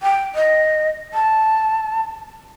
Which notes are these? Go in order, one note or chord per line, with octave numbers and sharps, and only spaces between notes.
G5
D#5
A5